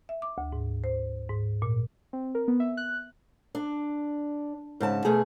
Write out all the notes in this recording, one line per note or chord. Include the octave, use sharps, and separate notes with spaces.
E5
D6
D2
G#2
C5
G#2
A#2
C4
A#4
B3
E5
F#6
D4
G#2 C#3 A5
B2 A3 G#4